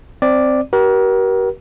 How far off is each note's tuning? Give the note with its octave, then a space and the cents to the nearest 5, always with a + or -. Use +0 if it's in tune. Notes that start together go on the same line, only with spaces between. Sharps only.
C4 +0 D5 +0
G4 -45 A#4 +35